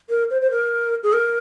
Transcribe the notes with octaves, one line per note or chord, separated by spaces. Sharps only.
A#4
C5
C5
A#4
G#4
A#4